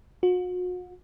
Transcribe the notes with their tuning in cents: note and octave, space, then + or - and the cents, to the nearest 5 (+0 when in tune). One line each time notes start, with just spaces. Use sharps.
F#4 -40